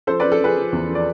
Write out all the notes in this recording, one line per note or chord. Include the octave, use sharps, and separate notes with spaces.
F3 A4 C5
F3 B4 D5
A4
F3 G#4 B4
F3
E2
F3
D5